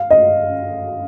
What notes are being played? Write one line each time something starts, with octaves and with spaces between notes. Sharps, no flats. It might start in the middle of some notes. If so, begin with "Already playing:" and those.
Already playing: F5
D#5